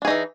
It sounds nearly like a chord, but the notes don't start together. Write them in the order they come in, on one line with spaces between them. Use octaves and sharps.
D4 G#4 D#4 E3